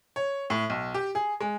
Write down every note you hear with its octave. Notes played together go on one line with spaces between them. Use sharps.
C#5
A2
B1
G4
G#4
G#3